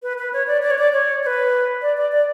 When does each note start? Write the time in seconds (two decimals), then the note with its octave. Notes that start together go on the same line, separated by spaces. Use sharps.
0.03 B4
0.18 B4
0.33 C#5
0.47 D5
0.62 D5
0.70 C#5
0.78 D5
0.93 C#5
1.23 C#5
1.26 B4
1.82 D5
1.97 D5
2.12 D5